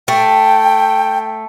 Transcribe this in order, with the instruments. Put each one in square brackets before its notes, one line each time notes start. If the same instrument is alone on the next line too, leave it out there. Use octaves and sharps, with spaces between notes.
[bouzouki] A3 [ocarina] G5